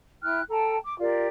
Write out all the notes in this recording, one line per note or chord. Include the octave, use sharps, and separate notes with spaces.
E4 G5 F6 F#6
A4 G5 A5 A#5
D6
F4 G4 A#4 D5